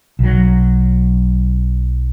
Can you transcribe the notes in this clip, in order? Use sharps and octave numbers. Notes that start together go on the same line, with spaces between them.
B1 F#3